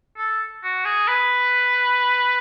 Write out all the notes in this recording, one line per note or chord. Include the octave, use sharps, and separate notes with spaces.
A4
F#4
G#4
B4